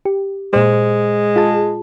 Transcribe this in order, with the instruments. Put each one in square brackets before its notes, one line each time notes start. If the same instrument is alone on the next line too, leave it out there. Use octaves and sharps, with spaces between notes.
[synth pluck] G4
[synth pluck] A#2 C5 [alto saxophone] G#3
[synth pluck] F4 G#4 A5